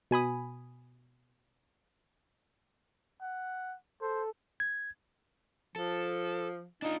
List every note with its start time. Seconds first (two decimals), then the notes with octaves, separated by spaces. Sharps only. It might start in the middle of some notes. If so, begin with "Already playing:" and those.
0.11 B2 G#5 B5 D#6
3.21 F#5
4.01 A4 C5
4.60 G#6
5.76 F3 A4
6.82 D4 D#4 F4